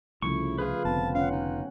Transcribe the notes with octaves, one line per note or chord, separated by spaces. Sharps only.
C2 C#3 F3 A3 E4 C#6
F4 G#4 B4
F1 D3 B3 C4 A5
C#4 F5 F#5
D#4